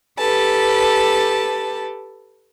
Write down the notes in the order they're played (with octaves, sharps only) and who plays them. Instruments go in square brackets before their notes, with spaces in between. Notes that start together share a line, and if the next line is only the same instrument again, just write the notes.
[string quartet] G4 A4 B4 A5